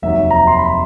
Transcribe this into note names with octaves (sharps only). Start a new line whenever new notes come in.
F1 D#2 D#3 F#3 E5
A#5
C6
B5